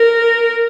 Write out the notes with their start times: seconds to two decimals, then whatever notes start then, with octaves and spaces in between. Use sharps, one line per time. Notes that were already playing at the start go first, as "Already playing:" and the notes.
Already playing: A#4